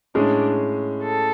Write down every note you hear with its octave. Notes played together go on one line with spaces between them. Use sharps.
A2 G#3 C#4 D4 G#4
A4